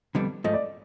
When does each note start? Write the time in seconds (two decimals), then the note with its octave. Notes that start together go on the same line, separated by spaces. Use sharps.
0.15 F2 D3 G3 B3 D4
0.44 G#2 F3 A3 D#5
0.54 D5